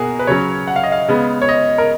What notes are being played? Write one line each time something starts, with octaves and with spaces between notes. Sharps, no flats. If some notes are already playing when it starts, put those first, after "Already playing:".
Already playing: B2 A#3 F#4 G#4 A#4
B4
C#3 F#3 C#4 C#5
F#5
F5
D#5
F5
C#3 G#3 B3
C#5
D#5
A#4